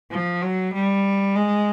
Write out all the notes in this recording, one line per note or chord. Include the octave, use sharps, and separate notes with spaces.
F3
F#3
G3
G#3